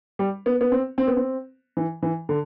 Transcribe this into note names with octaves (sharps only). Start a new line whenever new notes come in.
G3
B3
B3
C4
C4
B3
C4
E3
E3
D3